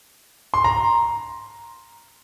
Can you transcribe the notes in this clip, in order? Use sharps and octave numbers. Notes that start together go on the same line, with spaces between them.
C6
A#5